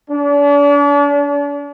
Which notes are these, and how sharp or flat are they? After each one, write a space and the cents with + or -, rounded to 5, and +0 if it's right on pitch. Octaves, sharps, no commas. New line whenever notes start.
D4 -40